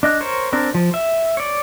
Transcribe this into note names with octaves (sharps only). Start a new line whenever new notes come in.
D4 D#5 F#6
A#4 C5 C#5
C4 D4 A#4
F3
E5
C#5 D5